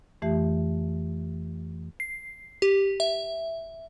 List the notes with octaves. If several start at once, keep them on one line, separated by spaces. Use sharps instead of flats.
F2 E3 A3 G4 E5
C7
G4
E5